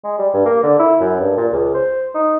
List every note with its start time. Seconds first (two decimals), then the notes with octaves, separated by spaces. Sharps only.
0.04 G#3
0.18 G3
0.34 G2
0.45 A#3
0.63 D3
0.79 E4
1.00 F#2
1.20 G2
1.37 A#2
1.52 C#2
1.74 C5
2.14 D#4